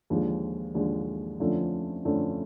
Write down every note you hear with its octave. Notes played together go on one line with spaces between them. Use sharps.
D#2 D3 F3 G#3
D#2 D3 F3 G#3
F2 D3 F3 A3 C#4
F2 D3 F3 A3 C#4